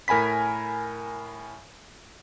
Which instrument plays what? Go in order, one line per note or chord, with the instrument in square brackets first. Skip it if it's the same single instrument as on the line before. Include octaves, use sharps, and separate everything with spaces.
[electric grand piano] A2 A#4 G#5 B5 B6